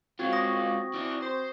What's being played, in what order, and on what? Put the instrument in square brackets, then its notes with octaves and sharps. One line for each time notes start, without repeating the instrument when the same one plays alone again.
[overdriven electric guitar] G#3 F4 [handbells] C4 F#4 G#6
[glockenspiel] C#6 D#6 A#6
[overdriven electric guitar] E4 D5
C5